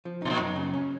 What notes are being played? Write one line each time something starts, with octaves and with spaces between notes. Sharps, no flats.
F3
B2 D#4
A#2
F#2
C#3
C#4